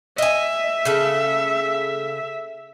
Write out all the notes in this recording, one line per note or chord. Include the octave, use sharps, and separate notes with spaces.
D#5 E5 G#5
C#3 A4